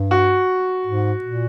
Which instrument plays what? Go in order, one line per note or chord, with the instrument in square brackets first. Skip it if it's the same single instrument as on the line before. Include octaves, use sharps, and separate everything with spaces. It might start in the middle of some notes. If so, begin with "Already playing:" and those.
Already playing: [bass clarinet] G2
[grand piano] F#4
[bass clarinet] G#2
A#2